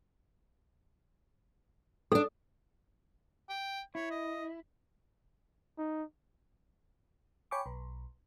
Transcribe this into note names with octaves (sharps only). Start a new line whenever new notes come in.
C4 D4 A4
G5
E4 C#5
D#5
D#4
C#5 G5 G#5 B5 C#6 D6
B1